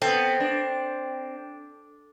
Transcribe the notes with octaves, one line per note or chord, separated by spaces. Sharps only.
B3 C4 A4
D4